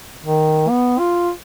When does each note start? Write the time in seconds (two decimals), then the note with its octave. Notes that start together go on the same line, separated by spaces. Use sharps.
0.24 D#3
0.69 B3
0.99 F4